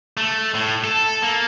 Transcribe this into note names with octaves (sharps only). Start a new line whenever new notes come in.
A3
A2
A4
A#3